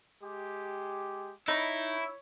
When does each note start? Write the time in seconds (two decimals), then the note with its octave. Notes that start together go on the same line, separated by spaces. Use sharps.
0.23 G#3 G4
1.48 D#4 E4 C#5